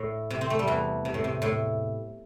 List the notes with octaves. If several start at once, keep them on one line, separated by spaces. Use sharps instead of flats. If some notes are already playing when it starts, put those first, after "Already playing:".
Already playing: A2
C3
C4
A3
G3
E2 E3
C3
A2
C3
A2